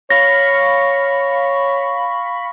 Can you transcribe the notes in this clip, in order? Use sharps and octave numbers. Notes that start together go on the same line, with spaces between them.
C#5 F5 B5 C#6 A#6